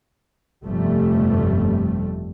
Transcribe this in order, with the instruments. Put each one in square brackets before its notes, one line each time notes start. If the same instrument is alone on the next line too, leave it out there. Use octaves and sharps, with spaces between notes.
[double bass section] G1 F2 C3 G3 A3